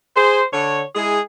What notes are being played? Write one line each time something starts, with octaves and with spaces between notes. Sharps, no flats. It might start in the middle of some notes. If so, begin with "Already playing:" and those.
G#4 C5
D3 C#5
G#3 E4 G#4